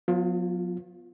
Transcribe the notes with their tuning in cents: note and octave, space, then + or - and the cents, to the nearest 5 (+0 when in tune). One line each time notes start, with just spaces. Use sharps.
F#3 -45 B3 +0 F4 +0